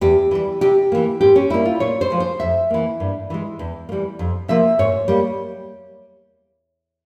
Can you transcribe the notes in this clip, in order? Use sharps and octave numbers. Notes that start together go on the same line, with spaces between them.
E2 G4
E3 G3
C3 G4
E3 A#3
G#2 G4
C#4
G3 A#3 E4
F4
A#2 C#5
C5
F3 G#3
C5
F2 E5
E3 A#3
G2
E3 G#3
E2
A#3
E3 G3
F2
C3 F3 A#3 E5
G#2 C#5
G3 A#3